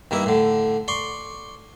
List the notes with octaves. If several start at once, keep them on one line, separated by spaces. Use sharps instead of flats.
G2 D#3 A#3 E4
A2 D3
D5 C6 C#6